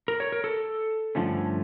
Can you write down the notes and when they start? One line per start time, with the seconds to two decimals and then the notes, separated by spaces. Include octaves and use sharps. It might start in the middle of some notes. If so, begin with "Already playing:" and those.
0.08 A#4
0.20 C#5
0.32 A#4
0.44 A4
1.15 G2 D3 F3 A3 C#4